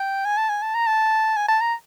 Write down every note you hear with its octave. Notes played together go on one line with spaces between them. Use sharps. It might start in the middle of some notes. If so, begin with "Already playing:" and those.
Already playing: G5
G#5
A5
G#5
A5
A#5
A5
G#5
A5
A#5